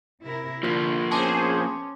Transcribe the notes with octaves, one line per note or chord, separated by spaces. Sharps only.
C3 E4 A#4
D3 F3 A#3 F4 B6
B3 C#4 G#4 C5 A5 C6 D6